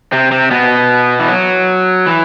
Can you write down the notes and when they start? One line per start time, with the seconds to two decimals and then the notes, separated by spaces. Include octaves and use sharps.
0.12 C3 C4
0.31 C3 C4
0.51 B2 B3
1.19 E3
1.28 F#3
2.06 E3